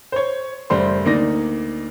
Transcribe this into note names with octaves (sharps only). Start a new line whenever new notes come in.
C5 C#5
F#1 G3 A3 C5 C6
D2 A#3 D#4 D5 A#6